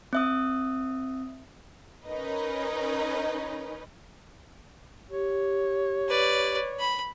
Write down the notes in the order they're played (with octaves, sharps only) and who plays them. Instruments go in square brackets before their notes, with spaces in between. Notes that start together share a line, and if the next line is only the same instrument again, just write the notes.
[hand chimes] C4 E5 D#6
[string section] C#4 D#4 A#4 B4 D#5
[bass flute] G4 [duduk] C#5
[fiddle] B4 D5
B5